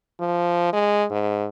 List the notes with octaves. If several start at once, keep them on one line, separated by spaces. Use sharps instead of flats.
F3
G#3
G#2